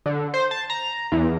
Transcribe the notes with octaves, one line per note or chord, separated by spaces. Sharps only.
D3
C5
A5
A#5
E2